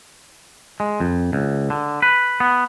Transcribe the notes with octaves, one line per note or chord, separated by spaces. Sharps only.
G#3
F2
C#2
D3
B4
B3